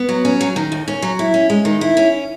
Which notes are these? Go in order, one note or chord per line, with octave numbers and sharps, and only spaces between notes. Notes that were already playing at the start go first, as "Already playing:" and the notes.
Already playing: B3
F#3
C#4
F#3
D#3
D#2
C#4
F#3
E4
C#4
G#3
D#3
E4
C#4